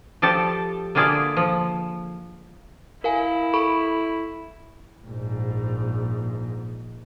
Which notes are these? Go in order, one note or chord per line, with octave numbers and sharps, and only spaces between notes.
F3 G4 A4 D5 A5
D3 A#3 F4 G#4 D5 E5
F3
E4 A#4 F5 G#5
A4 B5 C#6
A#1 G#2